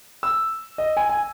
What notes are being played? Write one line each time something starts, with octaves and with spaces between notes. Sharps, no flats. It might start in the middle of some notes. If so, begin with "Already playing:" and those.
E6
D#5
G#5
G#5